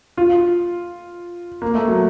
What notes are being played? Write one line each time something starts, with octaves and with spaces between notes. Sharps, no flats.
F4
A#3
A3
F#3